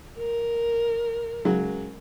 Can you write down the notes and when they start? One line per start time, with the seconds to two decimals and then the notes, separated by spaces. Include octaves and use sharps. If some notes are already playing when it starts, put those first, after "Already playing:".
0.18 A#4
1.45 C#3 F#3 G#3